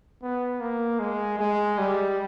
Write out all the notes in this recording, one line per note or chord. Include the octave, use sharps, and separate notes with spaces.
B3
A#3
G#3
G#3
G3